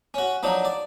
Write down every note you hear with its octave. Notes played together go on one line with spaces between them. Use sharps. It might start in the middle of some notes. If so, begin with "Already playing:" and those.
C#4 F#4
F3 F#3 D4 D#4
D5